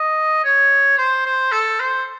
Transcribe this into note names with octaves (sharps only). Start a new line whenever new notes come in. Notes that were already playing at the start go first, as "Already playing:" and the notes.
Already playing: D#5
C#5
C5
C5
A4
C5